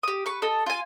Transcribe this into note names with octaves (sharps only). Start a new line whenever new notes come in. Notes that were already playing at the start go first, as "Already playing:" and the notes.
G4 D#6
B4 C#6
A4 D#5
F4 G#5